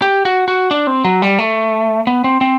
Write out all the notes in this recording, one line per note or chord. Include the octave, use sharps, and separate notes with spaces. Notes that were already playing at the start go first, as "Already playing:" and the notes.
G4
F#4
F#4
D4
C4
F#3
G3
A3
B3
C4
C4